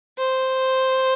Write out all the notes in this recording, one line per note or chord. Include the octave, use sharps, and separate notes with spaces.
C5